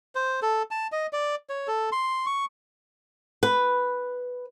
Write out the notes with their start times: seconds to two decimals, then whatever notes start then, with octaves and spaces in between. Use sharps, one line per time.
0.15 C5
0.42 A4
0.71 A5
0.92 D#5
1.13 D5
1.50 C#5
1.68 A4
1.92 C6
2.26 C#6
3.43 B4